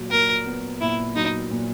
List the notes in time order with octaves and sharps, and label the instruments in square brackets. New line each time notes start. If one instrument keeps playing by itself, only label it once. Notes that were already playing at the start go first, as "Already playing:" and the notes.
Already playing: [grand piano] A#2 F#3
[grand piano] A#2 [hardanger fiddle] A#4
[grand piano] B3
[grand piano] A#2 [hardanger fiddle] E4
[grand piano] F#3 [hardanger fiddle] D#4
[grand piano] A#2